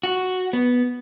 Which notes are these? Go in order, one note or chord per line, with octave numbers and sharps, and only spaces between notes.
F#4
B3